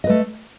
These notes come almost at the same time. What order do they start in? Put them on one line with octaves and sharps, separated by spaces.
D#5 B4 A3